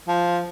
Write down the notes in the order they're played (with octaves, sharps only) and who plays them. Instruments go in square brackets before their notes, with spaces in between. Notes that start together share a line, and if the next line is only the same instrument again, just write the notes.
[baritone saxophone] F3